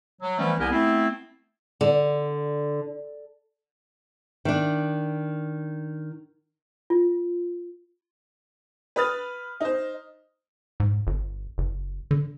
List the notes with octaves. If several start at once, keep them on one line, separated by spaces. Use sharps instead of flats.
F#3
E3 F3 G3 A3 B3 C#4
C2 B3 G4 A#4 G#5
A3 B3 C4 E4
D3
D#3 D4
F4
B4 B5 D#6 F6 A6
D#4 C5
G#2
G1
F#1
D3